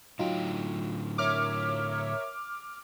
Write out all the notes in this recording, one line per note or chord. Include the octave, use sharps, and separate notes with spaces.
A2 D3 F#3 D#4 F4 G5
A#4 C#5 E5 D6 F6